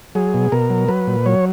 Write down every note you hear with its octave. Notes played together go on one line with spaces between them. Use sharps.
F#3 G#4
B2
B2 A#4
F#3
F#3 B4
A#2
F#3 C#5